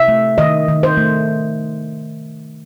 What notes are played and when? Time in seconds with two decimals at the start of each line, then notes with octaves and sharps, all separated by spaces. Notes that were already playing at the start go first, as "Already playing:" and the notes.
Already playing: C3 E5
0.08 A3
0.38 D#3 D#5
0.68 D#3
0.83 C5
0.97 A3